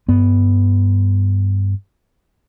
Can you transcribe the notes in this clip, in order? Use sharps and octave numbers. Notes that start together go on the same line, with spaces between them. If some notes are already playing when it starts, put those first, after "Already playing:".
G2 B3